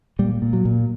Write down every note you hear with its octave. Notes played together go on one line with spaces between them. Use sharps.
A#2 G3
A#2
F#3
A#2